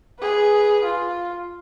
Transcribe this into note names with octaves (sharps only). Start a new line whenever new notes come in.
G#4 B4
F4